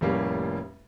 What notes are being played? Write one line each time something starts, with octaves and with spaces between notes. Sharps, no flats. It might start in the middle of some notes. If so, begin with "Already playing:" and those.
F1 A2 G3 A#3 C#4 F5